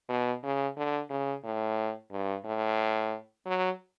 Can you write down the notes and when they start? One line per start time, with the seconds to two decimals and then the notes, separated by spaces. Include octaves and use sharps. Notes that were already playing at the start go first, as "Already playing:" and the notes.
0.09 B2
0.43 C#3
0.77 D3
1.10 C#3
1.44 A2
2.11 G2
2.45 A2
3.46 F#3